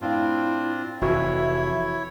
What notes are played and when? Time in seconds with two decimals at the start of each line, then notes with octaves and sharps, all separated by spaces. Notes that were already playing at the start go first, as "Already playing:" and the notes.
0.01 A2 C4 D4 E4 F4 F5
1.01 F1 F2 E3 E4 F#4 C#5 E5 A5